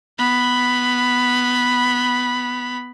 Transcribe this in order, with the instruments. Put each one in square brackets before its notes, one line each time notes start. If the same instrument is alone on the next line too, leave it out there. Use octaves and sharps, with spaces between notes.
[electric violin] B3 B5